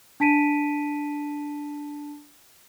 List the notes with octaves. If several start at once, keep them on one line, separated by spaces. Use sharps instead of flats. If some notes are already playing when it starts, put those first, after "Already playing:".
D4 A5 B6 D7 D#7